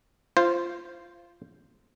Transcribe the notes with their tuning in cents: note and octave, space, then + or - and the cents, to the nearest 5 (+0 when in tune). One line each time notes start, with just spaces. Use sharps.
F4 -15 C5 +0